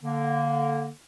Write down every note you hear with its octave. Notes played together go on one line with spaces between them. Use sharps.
D3 A#3